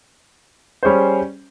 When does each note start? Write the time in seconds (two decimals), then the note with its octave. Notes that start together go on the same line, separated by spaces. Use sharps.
0.83 G3 C#4 G#4 C5